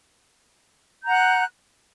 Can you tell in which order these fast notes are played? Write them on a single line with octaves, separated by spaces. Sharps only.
G6 A#5 F#5 F#6